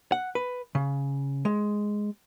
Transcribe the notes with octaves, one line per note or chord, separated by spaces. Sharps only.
F#5
B4
C#3
G#3